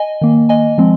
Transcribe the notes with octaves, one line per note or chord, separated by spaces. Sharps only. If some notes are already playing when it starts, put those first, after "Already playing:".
Already playing: D#5 G#5
D#3 A#3
D#5 G#5
F3 G#3 C4